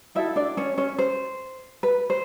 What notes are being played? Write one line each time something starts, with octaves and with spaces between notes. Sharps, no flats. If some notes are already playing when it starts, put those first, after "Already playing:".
D#4 E4 F#4 A4 E5
D4 D5
C#4 C#5
C#4 C#5
C5
B4
C5